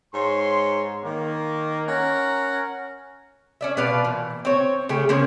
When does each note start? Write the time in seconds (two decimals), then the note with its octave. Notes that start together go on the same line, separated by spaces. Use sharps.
0.14 G#2 C#5 C6
1.03 D#3 A#3
1.88 C#4 A#4 F#5 A#5
3.61 C#4 D5 E5
3.77 B2 B4 D5 F5
4.04 A#2 E3
4.45 C4 C#5
4.89 C#3 A3 G4 G#4
5.09 C#3 A#3 C4 C#4